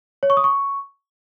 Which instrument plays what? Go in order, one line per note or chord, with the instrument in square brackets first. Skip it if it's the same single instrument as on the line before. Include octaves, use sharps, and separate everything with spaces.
[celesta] C#5
C#6
D#6
C#6